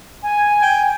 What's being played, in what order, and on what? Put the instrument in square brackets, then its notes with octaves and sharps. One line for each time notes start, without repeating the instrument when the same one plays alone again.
[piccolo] G#5
[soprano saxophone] G5